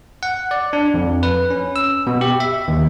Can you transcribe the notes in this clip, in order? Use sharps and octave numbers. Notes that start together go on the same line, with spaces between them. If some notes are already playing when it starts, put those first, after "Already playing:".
F#5
D5
D4
F2
B4
C#4
E6
B2
G4
E5
D#2